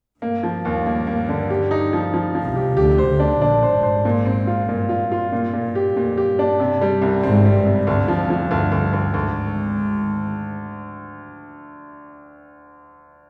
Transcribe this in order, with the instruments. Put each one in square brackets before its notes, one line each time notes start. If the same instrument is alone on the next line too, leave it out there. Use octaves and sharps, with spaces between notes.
[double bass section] G2 [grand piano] A#3
[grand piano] F3
D#2
A#3
A#3
D3
G4
D#4
F3
F3
F3
[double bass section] C2 C3
[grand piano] G4
[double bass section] D2 D3 [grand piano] G4
[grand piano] C5
[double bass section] D2 D3
[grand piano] D4
[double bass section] A#1 A#2 [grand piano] D4
[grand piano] C5
[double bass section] G#1 G#2
[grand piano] C5
A#2
C4
F4
[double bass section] G2 [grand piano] A#2
[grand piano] F4
[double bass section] G2
[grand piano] F4
A#2
A#2
[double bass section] G2
[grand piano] G4
[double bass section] F2 [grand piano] A#2
[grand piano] G4
[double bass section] G2
[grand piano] D4
C3
G3
C2
[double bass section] G#1 G#2 [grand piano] C4
[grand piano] G3
[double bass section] G2
[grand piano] C3
[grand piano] D2 [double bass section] G2
[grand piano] F3
[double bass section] F2
[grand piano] F3
[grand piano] D2 [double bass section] G2
[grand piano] D2
D2
[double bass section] G#1 G#2 [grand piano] D2